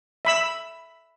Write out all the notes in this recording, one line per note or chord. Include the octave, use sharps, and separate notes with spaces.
E5 B5 E6